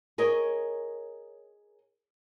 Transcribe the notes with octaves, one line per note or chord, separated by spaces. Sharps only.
G#4 A#4 C#5 D#5